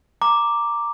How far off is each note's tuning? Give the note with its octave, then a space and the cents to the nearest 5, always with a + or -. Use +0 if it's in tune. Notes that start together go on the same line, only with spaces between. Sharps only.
A#5 -5 D6 +0